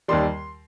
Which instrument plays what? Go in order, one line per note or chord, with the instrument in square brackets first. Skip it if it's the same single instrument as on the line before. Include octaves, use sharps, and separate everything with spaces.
[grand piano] D#2 D#3 G3 C6